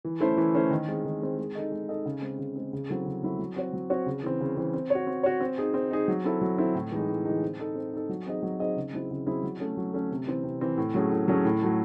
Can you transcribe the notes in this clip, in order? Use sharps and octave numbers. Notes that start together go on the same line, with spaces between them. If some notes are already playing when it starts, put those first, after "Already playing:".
E3
A3 C#4 E4 C5
E3
A3 C#4 E4 C5
D#3
G#3 C4
D#3
G#3 C4
G#3
D#4 A4 D#5
G#3
D#4 A4 D#5
C#3
G#3 C4
C#3
G#3 C4
C#3
F#3 C4 E4 A4
C#3
F#3 C4 E4 A4
F#3
C4 F#4 C#5
F#3
C4 F#4 C#5
C#3
E3 C4
C#3
E3 C4
C4
F#4 C#5
C4
F#4 C#5
C4
D#4 G#4
C4
D#4 G#4
F#3
C4 E4 A4
F#3
C4 E4 A4
A2
E3 G#3 D#4
A2
E3 G#3 D#4
C4
D#4 A4
C4
D#4 A4
F#3
C4 D#4 G#4 D#5
F#3
C4 D#4 G#4 D#5
C#3
F#3 C4 E4 G#4
C#3
F#3 C4 E4 G#4
F#3
A3 C#4
F#3
A3 C#4
C3
E3 C4
C3
E3 C4
A2
F#3 A3 C#4 G#4
A2
F#3 A3 C#4 G#4
A2
F#3 A3